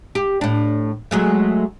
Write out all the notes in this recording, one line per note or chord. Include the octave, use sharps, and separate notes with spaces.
G4
A2 D4
F#3 G#3 A3